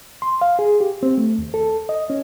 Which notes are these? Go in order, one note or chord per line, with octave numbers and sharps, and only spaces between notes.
C6
F5
G#4
G4
C4
A3
D#2
A4
D#5
C#4